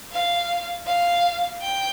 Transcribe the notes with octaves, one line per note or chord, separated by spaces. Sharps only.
F5
F5
G5